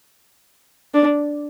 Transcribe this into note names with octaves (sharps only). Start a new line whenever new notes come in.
D4